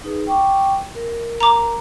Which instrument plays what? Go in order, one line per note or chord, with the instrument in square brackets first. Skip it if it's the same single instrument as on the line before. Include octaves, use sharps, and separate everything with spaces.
[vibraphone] D#4 G#4 B4
G5 C#6 D6
A#4
[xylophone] A#5 D6